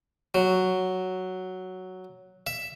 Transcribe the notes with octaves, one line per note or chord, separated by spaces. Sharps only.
F#3
E5